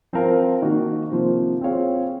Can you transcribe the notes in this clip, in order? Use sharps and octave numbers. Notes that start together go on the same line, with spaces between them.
F3 C4 F4 A#4 F5
D#3 A#3 D#4 F#4
C3 F3 A#3 F4 C5
C4 F4 G#4 C#5 F5